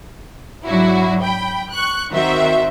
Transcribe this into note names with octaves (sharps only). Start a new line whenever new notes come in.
G#2 F#3 D4 E4 F#4
G5 B5
C#6 F#6
D#3 C4 F#4 C5 E5